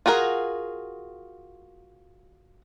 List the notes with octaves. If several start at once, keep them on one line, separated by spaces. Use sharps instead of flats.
F4 F#4 G#4 A#4